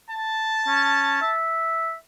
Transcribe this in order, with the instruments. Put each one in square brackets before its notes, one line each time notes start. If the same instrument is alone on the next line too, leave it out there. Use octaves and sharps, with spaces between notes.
[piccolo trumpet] A5
[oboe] C#4
E5